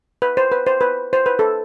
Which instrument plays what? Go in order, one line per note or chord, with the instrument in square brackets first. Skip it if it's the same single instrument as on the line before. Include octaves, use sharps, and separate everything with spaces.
[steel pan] B4
C5
B4
C5
B4
C5
B4
A4